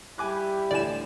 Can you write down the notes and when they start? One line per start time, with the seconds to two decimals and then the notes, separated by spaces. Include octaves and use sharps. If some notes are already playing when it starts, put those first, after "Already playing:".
0.18 G3 E4 G4 G#5 D6 F#6
0.71 D2 A2 D5 G#5 E7